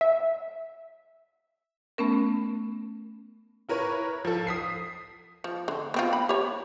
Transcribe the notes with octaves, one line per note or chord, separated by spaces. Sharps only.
E5
A3 B3 C#4 A#4
E4 A#4 B4 C#5
F3 A4
D#6 B6 C7
F3
D3
B3 C4 F4
B5
G4 C#5